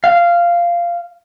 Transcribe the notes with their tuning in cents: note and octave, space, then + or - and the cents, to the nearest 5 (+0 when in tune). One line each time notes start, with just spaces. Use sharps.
F5 -10